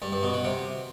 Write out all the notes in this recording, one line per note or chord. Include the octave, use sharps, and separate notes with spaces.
G2
G2
B2
B2
C3